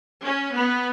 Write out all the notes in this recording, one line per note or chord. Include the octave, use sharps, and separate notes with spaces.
C#4
B3